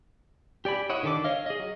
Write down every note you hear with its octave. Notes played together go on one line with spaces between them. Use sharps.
G4 D5 G#5 B5
E4 C#5 D#5 F#5
D3 D#3 G4 A4 D6
C#5 D#5 F5
G#4 D#5
F#3